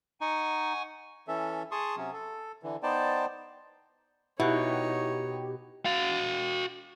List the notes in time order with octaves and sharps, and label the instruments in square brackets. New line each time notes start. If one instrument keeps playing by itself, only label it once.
[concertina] D#4 [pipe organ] F#5 G#5 C#6
[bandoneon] E3 C#4 A4 E5
G#4 A5 C6 C#6 D#6
C3 F#3 C#4
A4
D3 E3
B3 D#4 C5 D5 G5 A5
[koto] B2 [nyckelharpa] D#4 C#5 [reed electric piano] E4 F#6 [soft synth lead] G4
[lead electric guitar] F#4 F5